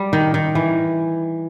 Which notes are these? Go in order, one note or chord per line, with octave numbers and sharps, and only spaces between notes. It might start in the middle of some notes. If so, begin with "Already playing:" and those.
Already playing: G3
D#3
D#3
E3